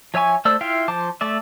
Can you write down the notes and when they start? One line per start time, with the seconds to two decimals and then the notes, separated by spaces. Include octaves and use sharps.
0.14 F3 C#5 E5 G#5 C#6
0.45 A3 C5 D5 E6
0.61 E4 F4 E5 F5 G5
0.88 F3 C5 A5 D6
1.21 A3 D5 E5